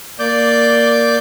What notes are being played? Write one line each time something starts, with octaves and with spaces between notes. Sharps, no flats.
A#3 D5 D6 G6